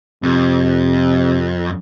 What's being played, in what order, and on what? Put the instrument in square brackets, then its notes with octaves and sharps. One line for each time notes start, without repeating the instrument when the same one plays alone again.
[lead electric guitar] F2 [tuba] C3